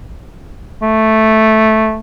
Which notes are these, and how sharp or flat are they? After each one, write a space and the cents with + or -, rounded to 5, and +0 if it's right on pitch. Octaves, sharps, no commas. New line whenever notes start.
A3 -5